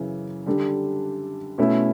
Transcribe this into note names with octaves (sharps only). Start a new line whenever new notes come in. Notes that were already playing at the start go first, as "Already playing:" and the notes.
Already playing: F#2 C#3 E3
D3 G3 D4 A4
B2 A3 C#4 E4